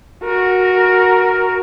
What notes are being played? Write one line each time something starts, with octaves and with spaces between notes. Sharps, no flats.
F#4 A#4